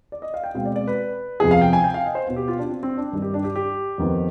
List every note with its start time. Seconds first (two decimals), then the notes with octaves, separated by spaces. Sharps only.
0.12 D5
0.22 D#5
0.34 F5
0.44 G5
0.54 B2 G#3 C4 F5
0.65 D5
0.76 D5
0.88 B4
1.40 F2 C3 F3 B3 G#4
1.51 F5
1.61 G5
1.73 G#5
1.84 G5
1.94 F5
2.05 D#5
2.15 C5
2.27 B2 B3
2.36 G4
2.48 F4
2.59 D4
2.69 C4
2.83 C4
2.97 D4
3.12 G2 D#3 G3
3.22 G4
3.34 D4
3.44 G4
3.56 G4
3.98 F2 D#3 B3